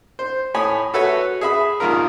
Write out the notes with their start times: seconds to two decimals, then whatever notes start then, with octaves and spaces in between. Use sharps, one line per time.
0.19 C5
0.54 A2 C#5 G#5 B5 D#6
0.94 F#4 A4 B4 C#5 E5
1.41 G#4 E5 B5
1.80 C2 G2 D#3 F4 A#4